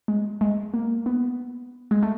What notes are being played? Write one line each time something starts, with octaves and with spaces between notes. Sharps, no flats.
G#3
G#3
A#3
B3
G#3
A3